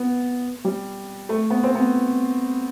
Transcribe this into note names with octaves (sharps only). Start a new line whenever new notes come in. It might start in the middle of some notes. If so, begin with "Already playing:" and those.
Already playing: B3
G3
A3
B3
C4
B3